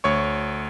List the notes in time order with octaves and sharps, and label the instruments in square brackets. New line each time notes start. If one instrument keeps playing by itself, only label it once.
[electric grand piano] D2 C#5 C#6